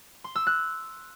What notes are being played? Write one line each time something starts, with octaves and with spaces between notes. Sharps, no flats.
C6
E6
F#6